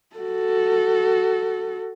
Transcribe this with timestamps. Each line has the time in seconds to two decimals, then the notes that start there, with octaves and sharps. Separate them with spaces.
0.16 F#4 A4